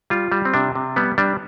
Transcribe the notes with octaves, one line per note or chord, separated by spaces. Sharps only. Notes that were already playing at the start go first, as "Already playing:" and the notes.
G3 F4
G3
C4
C3 D4
C3
G3 B3
G3 D4